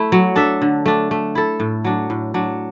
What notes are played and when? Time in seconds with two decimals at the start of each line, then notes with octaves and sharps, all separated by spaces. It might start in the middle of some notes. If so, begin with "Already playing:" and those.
Already playing: A3 E4
0.12 F#3
0.36 D4 A4 E5
0.62 D3
0.86 A3 D4
1.11 A3
1.35 E4 A4
1.60 A2
1.85 F#3 D4
2.10 A2
2.34 F#3 D4